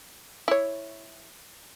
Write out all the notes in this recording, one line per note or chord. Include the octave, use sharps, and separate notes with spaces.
E4 C#5